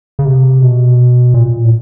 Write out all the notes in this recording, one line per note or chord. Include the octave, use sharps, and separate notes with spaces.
C#3
C3
B2
A#2
A2